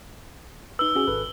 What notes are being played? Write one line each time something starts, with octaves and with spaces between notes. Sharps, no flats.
D#4 B4 E6 G7
C#4 F#4 G#4
G#1 A4 B4